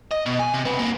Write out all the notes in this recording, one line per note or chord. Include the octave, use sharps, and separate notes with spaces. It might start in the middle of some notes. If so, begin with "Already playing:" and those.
D#5
B2
G#5
C3
C4 B4
A#3 C4